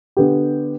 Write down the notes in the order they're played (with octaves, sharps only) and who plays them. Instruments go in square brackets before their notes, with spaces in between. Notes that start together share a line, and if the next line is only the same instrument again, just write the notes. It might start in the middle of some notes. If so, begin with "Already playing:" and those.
[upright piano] D3 B3 G4